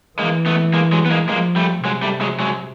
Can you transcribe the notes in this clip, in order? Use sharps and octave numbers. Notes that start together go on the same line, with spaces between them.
E3 G#3 A#3
A3 B3
G#3 A#3
F#3 G#3
B3
G#3 A#3
F3 G#3 A#3
G3 A3
C3 F#3 G#3
G3 A3
F#3 G#3
F#3 G#3